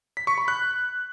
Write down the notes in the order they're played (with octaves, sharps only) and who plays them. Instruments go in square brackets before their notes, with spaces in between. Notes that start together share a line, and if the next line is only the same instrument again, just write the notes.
[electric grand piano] B6
C#6
B5
F#6